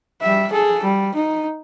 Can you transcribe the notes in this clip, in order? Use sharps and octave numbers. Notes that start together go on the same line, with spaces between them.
G3 E5
G#4 A4
G3
D#4